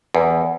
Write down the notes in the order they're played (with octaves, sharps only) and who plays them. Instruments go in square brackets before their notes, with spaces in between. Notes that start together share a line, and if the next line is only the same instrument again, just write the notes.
[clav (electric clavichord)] E2